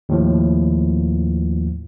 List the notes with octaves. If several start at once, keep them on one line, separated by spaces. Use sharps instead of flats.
D#2 A2 F3